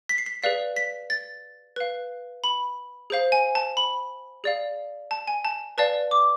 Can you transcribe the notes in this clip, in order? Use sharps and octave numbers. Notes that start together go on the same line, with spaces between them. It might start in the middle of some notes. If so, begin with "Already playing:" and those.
B6
C7
B6
G#4 B4 D5 F5 B6
B6
A6
B4 F5
B5
G#4 C5 F5
G#5
A5
B5
G#4 D5 F5
A5
G#5
A5
B4 D5 F5 A5
D6